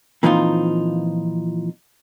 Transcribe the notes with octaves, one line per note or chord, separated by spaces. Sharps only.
A#2 E3 F3 C4 D#4 F4